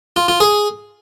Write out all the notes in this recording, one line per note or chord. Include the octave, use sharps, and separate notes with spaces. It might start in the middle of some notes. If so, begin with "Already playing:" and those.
F4
F4
G#4